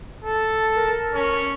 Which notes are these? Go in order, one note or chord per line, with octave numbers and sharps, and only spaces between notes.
A4
A#4
C#4